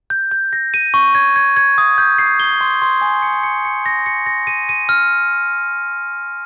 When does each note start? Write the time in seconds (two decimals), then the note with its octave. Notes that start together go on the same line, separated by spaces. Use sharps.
0.10 G6
0.31 G6
0.53 A#6
0.74 D#7
0.94 C#6
1.15 G#6
1.36 G#6
1.56 G#6
1.78 D#6
1.98 G6
2.18 C7
2.40 G7
2.61 C6
2.82 C6
3.01 G#5
3.22 C#7
3.43 C#7
3.65 C#7
3.86 A#6
4.06 C#7
4.26 A#6
4.47 D#7
4.69 D#7
4.89 F6